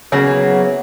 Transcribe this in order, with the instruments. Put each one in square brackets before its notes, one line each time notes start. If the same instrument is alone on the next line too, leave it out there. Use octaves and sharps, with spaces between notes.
[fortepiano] C#3 [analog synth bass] F#3 [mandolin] A#3 E4 F#4 [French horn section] B3 G#4